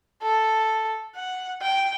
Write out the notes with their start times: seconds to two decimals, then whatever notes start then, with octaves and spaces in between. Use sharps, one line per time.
0.22 A4
1.16 F#5
1.62 G5